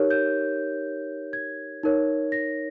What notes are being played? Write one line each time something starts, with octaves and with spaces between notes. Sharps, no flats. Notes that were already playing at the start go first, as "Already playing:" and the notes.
Already playing: D#4 G4 A#4 C#5
G6
G#6
D#4 A#4 C#5
A#6